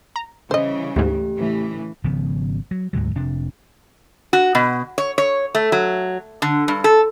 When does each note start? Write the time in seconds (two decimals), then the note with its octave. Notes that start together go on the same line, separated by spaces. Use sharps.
0.16 A#5
0.51 C#3 E3 G3 C5 D#5
0.96 D2 G#2 A3 G4
1.37 A2 C#3 E3
2.04 G#1 C#3 F3 B3
2.71 F#3
2.93 D2 G#2 D3 F#3
3.15 F1 C3 D4
4.33 F#4
4.55 B2
4.98 C#5
5.18 C#5
5.55 A3
5.72 F#3
6.42 D3
6.68 G2
6.84 A4